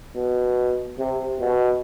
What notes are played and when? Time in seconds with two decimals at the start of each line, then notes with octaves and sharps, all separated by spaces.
0.15 B2
0.99 C3
1.40 B2